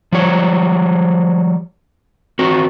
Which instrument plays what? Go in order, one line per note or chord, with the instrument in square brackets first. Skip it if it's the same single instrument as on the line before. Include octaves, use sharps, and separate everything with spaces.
[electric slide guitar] F3 G3 C#5
C4 F#4 A#4